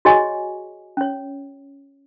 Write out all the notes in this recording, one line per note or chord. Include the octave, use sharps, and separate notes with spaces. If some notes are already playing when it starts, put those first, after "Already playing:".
F#4 G#4 C#5 D#5 G#5 C#6
C#4 C#5